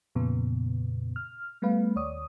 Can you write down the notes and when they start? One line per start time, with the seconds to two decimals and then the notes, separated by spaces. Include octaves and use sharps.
0.15 F2 A#2 C#3 B3
1.16 F6
1.62 G3 A3 B3 B4 F5
1.96 D#2 C#5 D5 D#6